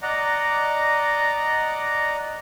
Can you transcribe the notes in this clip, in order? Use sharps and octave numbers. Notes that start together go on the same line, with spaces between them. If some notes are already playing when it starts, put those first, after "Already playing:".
D5 D#5 F#5 A#5